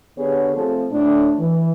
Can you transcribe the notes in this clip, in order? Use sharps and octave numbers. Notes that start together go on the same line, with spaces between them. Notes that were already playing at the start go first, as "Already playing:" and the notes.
D3 B3 G4 G#4 C#5
F3 A3 C4 A4
A2 A3 D4
E3